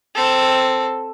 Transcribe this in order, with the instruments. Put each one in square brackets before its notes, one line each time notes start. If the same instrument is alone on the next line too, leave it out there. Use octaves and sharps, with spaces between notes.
[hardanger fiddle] C4 A4